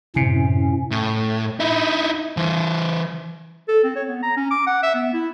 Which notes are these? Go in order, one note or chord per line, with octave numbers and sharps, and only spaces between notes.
F#2 A2 C3 C#4
A2
D#4 E4
E3 C5
A4
C4
C#5
B3
A#5
C#4
D6
F#5
E5
B3
E4